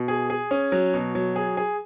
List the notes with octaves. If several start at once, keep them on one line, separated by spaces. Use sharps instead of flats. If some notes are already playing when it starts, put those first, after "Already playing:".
Already playing: B2
G#4
G#4
C#4
F#3
B2
F#3
G#4
G#4